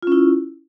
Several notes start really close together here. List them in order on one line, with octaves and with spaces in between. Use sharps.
F4 C#4 E4